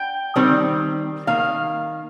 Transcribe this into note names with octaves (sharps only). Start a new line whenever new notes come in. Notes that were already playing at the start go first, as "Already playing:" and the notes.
Already playing: G5
D#3 G3 C4
D#3 A#3 F5